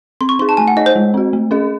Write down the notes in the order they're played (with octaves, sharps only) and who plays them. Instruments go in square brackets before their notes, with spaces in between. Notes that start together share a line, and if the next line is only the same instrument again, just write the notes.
[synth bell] C4 [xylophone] C6
[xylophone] C#6
[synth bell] D#4 G#4 [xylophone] C6
[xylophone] A5
[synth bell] A3 [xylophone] G#5
[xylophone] F#5
[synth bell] D#4 G#4 C#5 [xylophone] D#5
[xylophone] C5
[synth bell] G#3
C4 F#4
A3
C#4 G#4 D#5